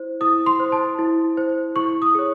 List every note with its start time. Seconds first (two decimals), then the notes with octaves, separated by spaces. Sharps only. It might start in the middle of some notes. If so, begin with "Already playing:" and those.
Already playing: E4 C5
0.21 E4 D#6
0.46 C6
0.60 C5
0.72 A5
0.99 E4
1.37 C5
1.76 E4 C#6
2.02 D#6
2.15 G#4 C#5